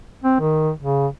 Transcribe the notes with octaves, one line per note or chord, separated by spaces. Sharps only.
C4
D#3
C#3